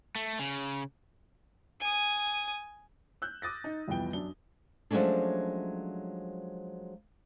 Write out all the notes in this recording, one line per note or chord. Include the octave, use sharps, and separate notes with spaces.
A3
C#3
G#5 D#6
E6 F#6 G6
D6 D#6 A6 A#6
D#4
C2 F2 E3 B3 G5 G7
F#2 D4 G7
F3 F#3 G#3 A3 C#4 D4